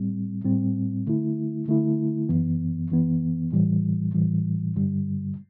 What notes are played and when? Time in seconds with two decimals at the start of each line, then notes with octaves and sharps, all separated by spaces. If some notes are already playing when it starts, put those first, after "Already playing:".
Already playing: A2 G3 C4
0.44 A2 G3 C4
1.06 D3 A3 E4
1.67 D3 A3 E4
2.29 F#2 E3 B3
2.91 F#2 E3 B3
3.52 A2 E3 G3
4.14 A2 E3 G3
4.76 G2 D3 G3